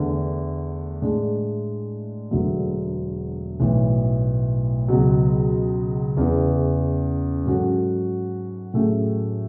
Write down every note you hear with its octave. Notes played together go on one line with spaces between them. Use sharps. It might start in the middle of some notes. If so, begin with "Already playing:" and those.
Already playing: E2 D3 A3
A2 G#3 D4
E1 E2 D3 F#3 A3
B1 A2 E3
C#2 B2 F#3
E2 C#3 E3
G#2 F#3 C#4 F#4 A4
A2 F#3 A3 C#4 G#4